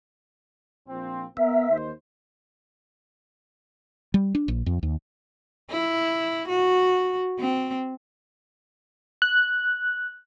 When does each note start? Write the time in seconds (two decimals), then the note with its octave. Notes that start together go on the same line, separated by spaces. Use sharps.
0.88 A#1 F3 C4
1.37 B3 A#4 E5
1.69 D#2 D#4 C5
4.14 G3
4.35 D4
4.48 A#1
4.66 F2
4.83 D#2
5.71 E4
6.48 F#4
7.39 C4
9.22 F#6